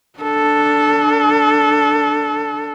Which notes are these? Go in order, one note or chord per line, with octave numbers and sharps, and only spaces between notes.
D4 A4